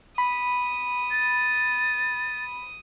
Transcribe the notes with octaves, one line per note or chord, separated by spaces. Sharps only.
B5 D#6
A6